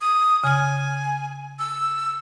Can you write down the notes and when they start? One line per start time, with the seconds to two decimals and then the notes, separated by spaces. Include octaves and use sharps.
0.01 D#6
0.44 C#3 G#5 F6
1.59 E6